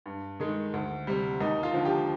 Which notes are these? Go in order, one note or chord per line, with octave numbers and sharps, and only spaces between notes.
G2
D#3 G#3
D2
C3 G3
D#2 D#4
F4
D3 F3
G4